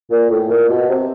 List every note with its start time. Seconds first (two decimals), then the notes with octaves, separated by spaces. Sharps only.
0.10 A#2
0.30 A2
0.49 A#2
0.69 B2
0.89 C3